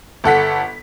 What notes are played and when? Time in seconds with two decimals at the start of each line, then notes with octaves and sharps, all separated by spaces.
0.24 G1 A4 F#5 B6